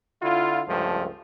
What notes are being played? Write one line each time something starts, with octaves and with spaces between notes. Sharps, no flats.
D3 E4 F4
C#2 G2 F3 A3